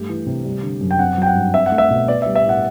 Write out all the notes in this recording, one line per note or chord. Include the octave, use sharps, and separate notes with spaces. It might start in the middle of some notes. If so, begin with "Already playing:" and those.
Already playing: G2 A3 G4
E3
C3
G3
D3
F#2
G5
C4 F#5
F#3 G5
F#5
G2
C4 E5
F#5
A3
E5
B2
B3 D5
G3 E5
E5
A2 F#5